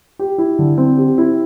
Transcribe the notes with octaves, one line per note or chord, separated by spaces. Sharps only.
G4
E4
D3
C4
G4
E4